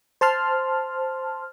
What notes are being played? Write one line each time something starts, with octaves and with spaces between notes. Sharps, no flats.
C5 A5 C6 F6